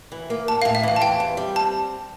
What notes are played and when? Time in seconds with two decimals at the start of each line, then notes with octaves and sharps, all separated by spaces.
0.12 E3
0.30 A#3
0.48 A2 A5
0.62 F5
0.65 A2
0.75 E5
0.83 E3 F5
0.96 A5
1.02 E2 G5
1.20 C3
1.37 G3
1.56 C4 A5